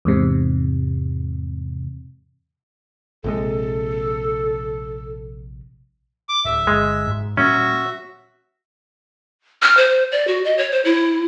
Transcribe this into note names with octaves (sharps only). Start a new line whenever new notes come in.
E2 G#2 C3
A#1 C3 G#3 A4
D6
D1 E5
G1 G#3
G#2
A#2 G3 A#3 C#4 F#4 E5
F6
C5
D5
F#4
D#5
C#5
C5
E4